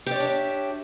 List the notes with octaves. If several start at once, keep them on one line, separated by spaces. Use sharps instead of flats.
D4 G4 C#5 D5 E5